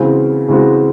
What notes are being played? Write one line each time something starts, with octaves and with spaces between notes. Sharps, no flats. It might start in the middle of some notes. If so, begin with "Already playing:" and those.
Already playing: C#3 E3 G#3 C4 F#4
C#3 E3 G#3 C4 F#4